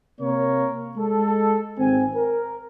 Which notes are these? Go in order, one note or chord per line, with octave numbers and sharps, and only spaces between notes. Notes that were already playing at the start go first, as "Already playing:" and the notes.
C3 A#3 A#4 C#5
G#3 A4
G#1 C4 G#5
A#4